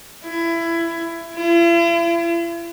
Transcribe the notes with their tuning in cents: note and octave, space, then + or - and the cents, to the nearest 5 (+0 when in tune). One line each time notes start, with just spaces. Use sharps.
E4 +20
E4 +45